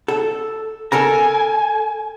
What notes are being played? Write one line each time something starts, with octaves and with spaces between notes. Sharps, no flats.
A4
A4 A#4 G#5 A#5